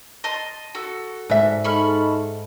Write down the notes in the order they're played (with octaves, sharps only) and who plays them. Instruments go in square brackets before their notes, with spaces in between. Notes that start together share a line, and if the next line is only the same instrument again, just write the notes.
[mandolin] D#5 A5 C6
F#4 A4
[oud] G#2 E5
[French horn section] G#3 D#4 A4 [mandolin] B5 C#6 F6